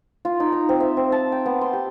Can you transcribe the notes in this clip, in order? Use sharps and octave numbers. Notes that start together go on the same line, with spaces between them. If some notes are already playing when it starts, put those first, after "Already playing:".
F4
D#4
A#5
C4
E5
C4
A5
G5
B3
C6
G4